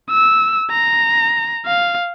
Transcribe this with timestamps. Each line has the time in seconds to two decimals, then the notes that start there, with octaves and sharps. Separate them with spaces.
0.10 E6
0.71 A#5
1.67 F5